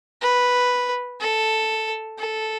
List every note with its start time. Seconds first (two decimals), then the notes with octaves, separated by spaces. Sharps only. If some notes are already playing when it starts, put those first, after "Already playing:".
0.21 B4
1.20 A4
2.18 A4